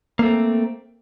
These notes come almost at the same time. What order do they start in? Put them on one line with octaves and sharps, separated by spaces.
A#3 A3 C4